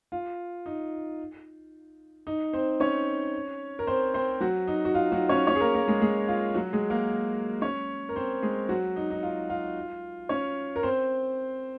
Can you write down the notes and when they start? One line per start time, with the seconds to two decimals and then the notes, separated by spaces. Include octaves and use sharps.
0.12 F4
0.66 D#4
2.27 D#4
2.53 C4 C5
2.80 C#4 C#5
3.79 A#4
3.87 C4 C5
4.14 C4 C5
4.40 F#3 F#4
4.67 D#4
4.85 F#4
4.94 F4
5.12 F#3 F#4
5.29 C#4 C#5
5.47 C#4 C#5
5.55 G#4
5.61 A#3 A#4
5.75 A#3 A#4
5.88 G#3 G#4
6.01 G#3 G#4
6.28 F4
6.54 F#3 F#4
6.73 G#3 G#4
6.90 A#3 A#4
7.61 C#4 C#5
8.09 A#4
8.16 C4 C5
8.42 G#3 G#4
8.69 F#3 F#4
8.96 D#4
9.11 D#4
9.23 F4
9.50 F4
10.29 C#4 C#5
10.76 A#4
10.83 C4 C5